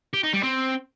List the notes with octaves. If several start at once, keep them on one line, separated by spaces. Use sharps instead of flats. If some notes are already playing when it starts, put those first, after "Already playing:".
G4
D#4
G3
C4